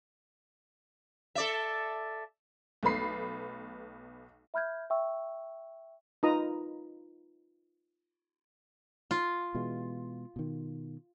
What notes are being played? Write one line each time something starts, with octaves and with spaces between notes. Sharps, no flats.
A4 D5 E5
B1 A3 B3 B5 C7
E5 B5 F6 G6 G#6
E5 G5 C#6 E6
D#4 F4 B4 A#5 D#6
F4
B2 E3 G#3
B2 D#3